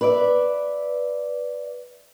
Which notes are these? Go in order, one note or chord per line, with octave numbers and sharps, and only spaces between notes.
B4 D5 E5